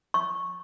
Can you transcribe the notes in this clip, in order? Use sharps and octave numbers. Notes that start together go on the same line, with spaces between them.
C#6